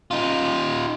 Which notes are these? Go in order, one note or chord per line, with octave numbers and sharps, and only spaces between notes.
D#4 F4